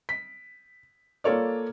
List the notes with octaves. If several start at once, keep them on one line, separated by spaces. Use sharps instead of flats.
B6
A#3 F4 A4 C#5 D5